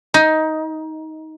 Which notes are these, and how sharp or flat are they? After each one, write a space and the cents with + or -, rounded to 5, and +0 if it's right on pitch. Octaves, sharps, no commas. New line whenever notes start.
D#4 +15